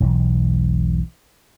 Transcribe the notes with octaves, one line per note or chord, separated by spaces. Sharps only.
E1 B1 E3